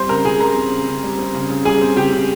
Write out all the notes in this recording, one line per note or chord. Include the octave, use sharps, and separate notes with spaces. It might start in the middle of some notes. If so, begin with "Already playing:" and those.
Already playing: G3 C4 C5 C6
C#3 A#4 A#5
C#3 G#4 G#5
G3 A#4 A#5
C4
C#3
C#3
G3
C4
C#3
C#3
G3 G#4 G#5
C4
C#3 G4 G5
C#3